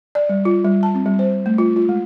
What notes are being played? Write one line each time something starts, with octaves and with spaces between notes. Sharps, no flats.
D5
G3
F4
G3
A5
C4
G3
C5
A3
F4
F4
G#3